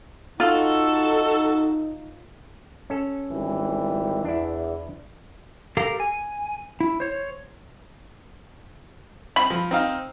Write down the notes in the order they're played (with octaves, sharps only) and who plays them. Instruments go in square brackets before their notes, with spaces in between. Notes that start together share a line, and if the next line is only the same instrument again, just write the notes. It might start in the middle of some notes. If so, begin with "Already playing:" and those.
[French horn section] D#4 [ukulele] F4 [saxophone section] F#4 A4
[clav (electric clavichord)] C#4 A4
[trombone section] G#1 E3 G3
[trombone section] E2 [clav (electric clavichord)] D4 E4
[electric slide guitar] G4 A4 A#4 F5
G#5
E4
C5 C#5
[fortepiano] C4 [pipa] B5
[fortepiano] F3
C4 D#4 F5